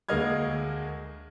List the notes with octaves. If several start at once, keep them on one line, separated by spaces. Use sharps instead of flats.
D2 G#3 A#3 D#5 F6 G#6